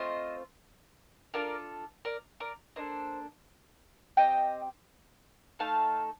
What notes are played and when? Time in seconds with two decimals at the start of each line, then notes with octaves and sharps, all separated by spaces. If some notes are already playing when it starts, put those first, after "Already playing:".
Already playing: A3 C4 F4 C5 D#5
1.34 D4 F4 A4 A#4 D5
2.05 A#4 D5
2.40 A#4 D5
2.76 A#3 D4 A4 C5 D#5
4.17 C4 G4 D#5 G5
5.59 A3 D#4 A4 F5 A5